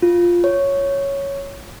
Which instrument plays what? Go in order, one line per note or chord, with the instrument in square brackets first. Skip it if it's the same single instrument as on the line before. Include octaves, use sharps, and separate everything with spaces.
[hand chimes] F4
C#5